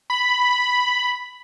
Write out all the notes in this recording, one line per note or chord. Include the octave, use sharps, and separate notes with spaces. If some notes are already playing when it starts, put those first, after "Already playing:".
B5